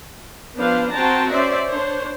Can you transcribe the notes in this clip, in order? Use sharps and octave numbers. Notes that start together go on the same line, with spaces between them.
F3 B3 D4 B4 C5 F5
C4 F#4 C5 G5 A5 A#5
C#4 C5 D5 E5
D4 C5 C#5